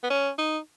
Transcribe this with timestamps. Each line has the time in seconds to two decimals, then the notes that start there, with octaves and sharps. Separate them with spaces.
0.03 B3
0.10 C#4
0.38 D#4